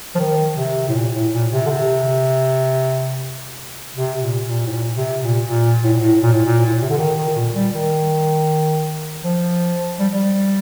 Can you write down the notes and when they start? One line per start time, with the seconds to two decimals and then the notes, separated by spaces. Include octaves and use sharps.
0.15 F3
0.19 D#3
0.57 C3
0.89 A2
0.95 A#2
1.14 A2
1.33 A#2
1.52 C3
1.66 D3
1.70 C3
3.96 C3
4.21 A#2
4.46 A#2
4.67 A2
4.71 A#2
4.97 C3
5.22 A#2
5.47 A#2
5.84 A2
5.92 A#2
6.00 A2
6.22 A#2
6.33 A2
6.46 A#2
6.66 A2
6.74 A#2
6.82 C3
6.90 D3
6.97 D#3
7.17 D#3
7.35 A#2
7.55 G3
7.73 D#3
9.24 F3
9.99 G3
10.14 G3